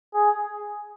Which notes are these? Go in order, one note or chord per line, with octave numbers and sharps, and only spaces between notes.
G#4